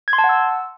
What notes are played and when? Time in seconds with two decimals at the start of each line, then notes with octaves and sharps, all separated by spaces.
0.08 G#6
0.13 C6
0.18 A5
0.24 F#5
0.29 E6